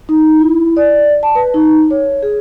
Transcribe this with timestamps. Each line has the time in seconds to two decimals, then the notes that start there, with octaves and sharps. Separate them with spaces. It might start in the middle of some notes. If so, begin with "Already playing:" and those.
0.09 D#4
0.39 E4
0.77 D5
1.23 A5
1.35 B4
1.54 D#4
1.91 C#5
2.23 G#4